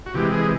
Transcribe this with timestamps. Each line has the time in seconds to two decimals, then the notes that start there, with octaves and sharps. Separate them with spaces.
0.06 F#4
0.14 C3 E3 G#3 G4
0.34 G#4